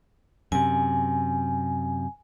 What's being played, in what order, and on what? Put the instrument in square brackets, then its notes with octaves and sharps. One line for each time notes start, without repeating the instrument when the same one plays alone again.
[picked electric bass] F#2 C3 [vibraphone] G#5